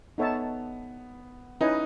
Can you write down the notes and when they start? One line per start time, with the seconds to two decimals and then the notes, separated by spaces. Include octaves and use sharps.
0.18 B3 D#4 A4 C#5 E5 A5
1.61 C#4 D#4 E4 B4 D#5 G#5